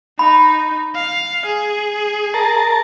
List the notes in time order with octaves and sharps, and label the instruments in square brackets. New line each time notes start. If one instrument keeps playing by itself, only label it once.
[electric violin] D#4 [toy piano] B5
[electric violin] F5
G#4
[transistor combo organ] A#4 A5